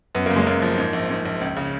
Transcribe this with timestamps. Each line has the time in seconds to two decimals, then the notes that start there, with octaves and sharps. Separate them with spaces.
0.15 F#2 B3
0.26 F#1 A#3
0.36 G#3
0.47 F#2 A#3
0.62 F3
0.78 G#2
0.93 A#1
1.10 G#2
1.26 A#1
1.41 C#2
1.57 C#3